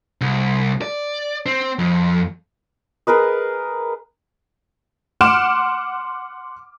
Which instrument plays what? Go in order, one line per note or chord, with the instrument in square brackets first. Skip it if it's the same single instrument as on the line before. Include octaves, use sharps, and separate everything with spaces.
[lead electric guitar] C2
D5
C4
F2
[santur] G#4 A#4 B4 D#5
[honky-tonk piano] F#5 C6 D6 F6 D7 E7